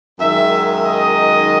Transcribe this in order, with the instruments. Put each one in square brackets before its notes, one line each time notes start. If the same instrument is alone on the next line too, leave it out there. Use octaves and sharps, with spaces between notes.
[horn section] F#2 D#3 G#3 E5
D#5